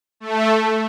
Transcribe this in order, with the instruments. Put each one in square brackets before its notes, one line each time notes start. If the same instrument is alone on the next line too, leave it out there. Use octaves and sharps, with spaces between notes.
[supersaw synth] A3